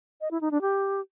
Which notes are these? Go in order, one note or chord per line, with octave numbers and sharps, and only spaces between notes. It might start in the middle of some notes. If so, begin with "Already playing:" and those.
D#5
E4
D#4
D4
G4